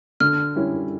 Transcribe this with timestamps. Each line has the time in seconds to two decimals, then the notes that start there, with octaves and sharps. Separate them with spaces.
0.20 D3 F6
0.56 G3 C#4 E4